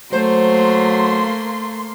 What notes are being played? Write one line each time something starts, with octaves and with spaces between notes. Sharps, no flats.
F#3 A3 A#3 C5 C6